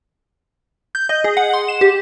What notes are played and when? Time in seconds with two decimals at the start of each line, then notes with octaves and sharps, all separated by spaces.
0.95 G6
1.09 D#5
1.24 G#4
1.37 F#5
1.53 C6
1.68 E7
1.81 G4